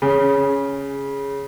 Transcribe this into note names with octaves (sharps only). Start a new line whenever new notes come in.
C#3